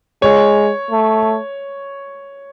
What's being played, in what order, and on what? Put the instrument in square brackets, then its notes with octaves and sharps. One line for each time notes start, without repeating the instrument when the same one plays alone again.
[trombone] G#3 [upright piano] C#5
[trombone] A3